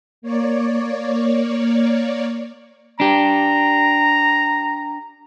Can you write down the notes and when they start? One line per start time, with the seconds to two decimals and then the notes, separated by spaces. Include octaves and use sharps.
0.22 A#3 C#5 D5
3.00 D4 G4 A#5